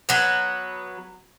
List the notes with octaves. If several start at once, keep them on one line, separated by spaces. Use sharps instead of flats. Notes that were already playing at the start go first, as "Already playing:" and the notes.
F#3 B3